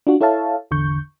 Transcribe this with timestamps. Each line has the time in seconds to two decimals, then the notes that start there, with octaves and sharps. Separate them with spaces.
0.07 D4 F4 F#4
0.21 E4 A4 C#5 E5 F5 A5
0.71 G#1 E2 D3 C#6 G6